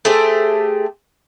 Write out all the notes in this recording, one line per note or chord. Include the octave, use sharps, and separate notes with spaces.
A3 G4 G#4 C5